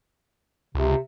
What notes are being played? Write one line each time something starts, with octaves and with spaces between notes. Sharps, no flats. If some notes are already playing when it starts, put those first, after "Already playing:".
C#2 C3